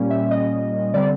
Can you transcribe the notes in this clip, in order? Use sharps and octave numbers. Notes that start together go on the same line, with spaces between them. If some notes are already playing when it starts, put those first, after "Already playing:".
Already playing: A#2 G3 A#3 C#4
E5
D#5
D3 G3 C4 D5